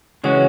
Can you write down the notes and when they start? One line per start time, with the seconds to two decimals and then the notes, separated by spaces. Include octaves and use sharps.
0.24 C#3 E3 G#3 C#4 F#4 C#5